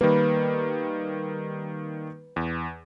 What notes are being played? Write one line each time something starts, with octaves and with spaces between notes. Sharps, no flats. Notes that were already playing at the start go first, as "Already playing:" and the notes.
D#3 G3 A#3 B4
E2